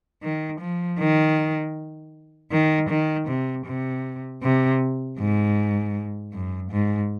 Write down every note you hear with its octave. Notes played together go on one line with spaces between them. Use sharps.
D#3
F3
D#3
D#3
D#3
C3
C3
C3
G#2
F#2
G#2